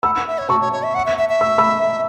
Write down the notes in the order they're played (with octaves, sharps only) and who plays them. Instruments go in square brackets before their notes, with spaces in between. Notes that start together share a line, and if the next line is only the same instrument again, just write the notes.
[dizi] F#5 [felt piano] B5 E6
[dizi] F#5
E5
C#5
[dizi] F#4 [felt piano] A5 C#6
[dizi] C#5
C#5
E5
F#5
E5
E5
E5
[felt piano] E6
B5 E6